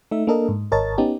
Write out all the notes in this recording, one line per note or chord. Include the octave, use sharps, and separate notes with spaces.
A3 D#4 E5
A#3 D4 A4 A#4 D#5
G#2
G#1 A#4 C#5 D#5 A5 A6
B3 C#4 D#4 G4